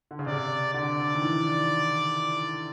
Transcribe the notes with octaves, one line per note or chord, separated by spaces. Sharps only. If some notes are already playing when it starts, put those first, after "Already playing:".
D3
C#3
C3 D5
D3 D5
D#3
E3